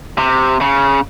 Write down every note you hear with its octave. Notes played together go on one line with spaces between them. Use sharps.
C3
C#3